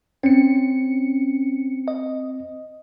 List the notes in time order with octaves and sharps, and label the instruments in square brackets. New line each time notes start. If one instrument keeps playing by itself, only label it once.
[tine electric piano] C4 [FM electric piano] C#4 C#7
[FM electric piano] D#5